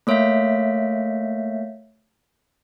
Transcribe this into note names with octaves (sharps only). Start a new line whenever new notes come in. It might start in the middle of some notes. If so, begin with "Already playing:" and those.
A3 A#3 C#5 E5 F5 B6